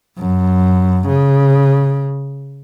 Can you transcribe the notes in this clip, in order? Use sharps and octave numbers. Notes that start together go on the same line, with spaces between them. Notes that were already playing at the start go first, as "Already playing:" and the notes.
F#2
C#3